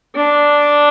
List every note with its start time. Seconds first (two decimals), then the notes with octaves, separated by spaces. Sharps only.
0.16 D4